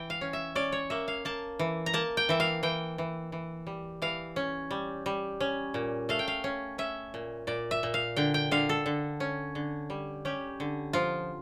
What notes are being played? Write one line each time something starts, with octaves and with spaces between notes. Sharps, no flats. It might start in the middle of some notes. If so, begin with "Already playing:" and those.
Already playing: E3 G5
F5
C#4
E5
C#4 D5
C#5
A#3 E5
F5
A#3 A5
E3
A#5
A#3 A5
G5
E3 E5
F5
E3 G5
E3
E3
G3
E3 F5
C#4
G3
G3
C#4
A#2
A3 F5
G5
F5
C#4
C#4 E5
A#2
A#2 D5
E5
A#2
F5
D3 G5
G5
D3 F5
A4
D3
C#4
D3
G3
C#4 G4
D3
F3 F4